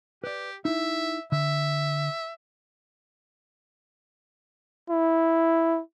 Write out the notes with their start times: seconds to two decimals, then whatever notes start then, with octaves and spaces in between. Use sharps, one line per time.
0.24 G4 B4 D5
0.65 D#4 E4 E5
1.32 D3 E5
4.90 E4